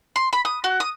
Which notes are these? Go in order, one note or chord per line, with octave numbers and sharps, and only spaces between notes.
C6
B5
D#6
F#4
D#6